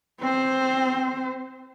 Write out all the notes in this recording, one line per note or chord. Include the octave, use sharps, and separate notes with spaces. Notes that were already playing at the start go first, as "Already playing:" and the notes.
C4 C5